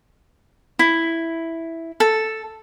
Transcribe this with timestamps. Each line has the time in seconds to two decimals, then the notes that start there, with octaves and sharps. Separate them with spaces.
0.79 E4
2.00 A4